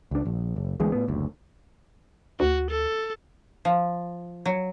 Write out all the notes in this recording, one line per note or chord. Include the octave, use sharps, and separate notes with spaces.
C#2 D4
A#1
F#1
D2 E3 G#3 B3
A2 B3
F#1 D2
D2 F#4
A4
F3
F#3